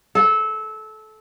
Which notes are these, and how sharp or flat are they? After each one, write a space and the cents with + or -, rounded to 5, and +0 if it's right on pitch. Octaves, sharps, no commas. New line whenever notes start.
A4 -20